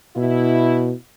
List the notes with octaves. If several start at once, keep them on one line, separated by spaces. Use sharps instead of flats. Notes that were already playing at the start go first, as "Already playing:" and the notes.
B2 E4